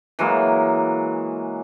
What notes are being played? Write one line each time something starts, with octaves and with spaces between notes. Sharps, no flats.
E3 F#3 G#3 A#3